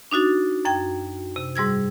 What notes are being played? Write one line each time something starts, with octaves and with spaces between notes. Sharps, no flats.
D4 D#4 F#4 A6
F#2 G5 G#6
C3
G#2 G3 E6 G#6